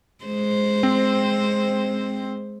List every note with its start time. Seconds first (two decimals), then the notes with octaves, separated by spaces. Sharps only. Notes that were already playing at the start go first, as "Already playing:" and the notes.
0.25 G#3 C5
0.83 C4